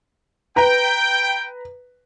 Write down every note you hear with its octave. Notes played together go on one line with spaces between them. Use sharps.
B4 G5 A#5